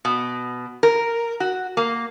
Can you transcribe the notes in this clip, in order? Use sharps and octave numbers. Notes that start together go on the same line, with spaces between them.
B2
A#4
F#4
A#3